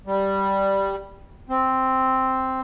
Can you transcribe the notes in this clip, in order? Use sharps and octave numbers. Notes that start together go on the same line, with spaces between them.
G3
C4